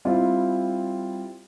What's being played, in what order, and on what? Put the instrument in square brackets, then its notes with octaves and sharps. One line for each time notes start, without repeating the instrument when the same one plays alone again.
[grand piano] G3 C4 E4 F4